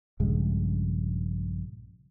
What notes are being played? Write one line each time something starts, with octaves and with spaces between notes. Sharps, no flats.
A#1 G2 C#3 G#3